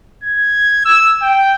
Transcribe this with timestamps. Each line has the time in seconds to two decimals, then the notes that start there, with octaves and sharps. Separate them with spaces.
0.24 G#6
0.85 E6
1.22 G5